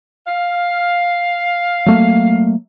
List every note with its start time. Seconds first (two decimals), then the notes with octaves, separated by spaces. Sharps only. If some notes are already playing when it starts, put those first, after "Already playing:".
0.27 F5
1.86 F#3 A3 A#3